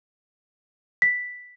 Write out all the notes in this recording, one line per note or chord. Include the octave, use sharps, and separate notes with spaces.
B6